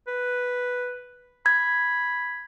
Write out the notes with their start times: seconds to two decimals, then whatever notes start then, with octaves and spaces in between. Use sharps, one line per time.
0.07 B4
1.46 B5 G#6